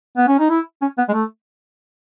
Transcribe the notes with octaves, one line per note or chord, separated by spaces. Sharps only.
B3
C#4
D#4
E4
C#4
B3
G#3
A3